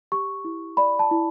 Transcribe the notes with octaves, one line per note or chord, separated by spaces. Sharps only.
G4 C#6
E4
D5 B5
A5
E4